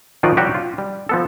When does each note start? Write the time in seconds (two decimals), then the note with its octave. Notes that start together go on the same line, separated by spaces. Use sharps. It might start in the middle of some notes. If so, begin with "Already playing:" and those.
0.23 D#3 F3 B3 F4 F#4 D5
0.37 F#3 G3 F#4 G4
0.54 F4
0.78 G3
1.09 F3 B3 A4